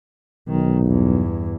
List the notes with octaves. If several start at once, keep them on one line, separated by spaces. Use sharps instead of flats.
B1 D#3
E2 G2